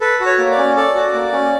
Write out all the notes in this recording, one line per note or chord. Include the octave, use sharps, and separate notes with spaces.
A4 B4
F#4
C#5
A#3
D5
C#4
A4 D5
F#4
A#3
C#4